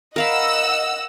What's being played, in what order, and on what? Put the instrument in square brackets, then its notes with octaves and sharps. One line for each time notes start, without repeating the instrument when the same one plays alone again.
[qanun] A#4 F5 B5 [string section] D#5 F#5 E6